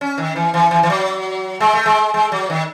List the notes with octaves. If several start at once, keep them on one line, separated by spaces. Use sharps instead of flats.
C#4
D#3
E3
E3
E3
E3
F#3
G#3
A3
G#3
G#3
F#3
D#3